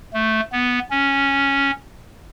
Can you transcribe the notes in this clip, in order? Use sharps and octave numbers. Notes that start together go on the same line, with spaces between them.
A3
B3
C#4